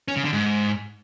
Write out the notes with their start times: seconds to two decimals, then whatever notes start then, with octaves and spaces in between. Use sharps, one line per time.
0.08 C#4
0.16 C#3
0.24 D3
0.33 G#2